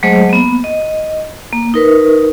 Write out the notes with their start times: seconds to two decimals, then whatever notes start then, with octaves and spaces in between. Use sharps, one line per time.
0.03 F#3 G#3 A3 G#4 C5 D#5
0.29 A#3 B3
0.64 D#5
1.53 A#3
1.74 D#4 A#4 B4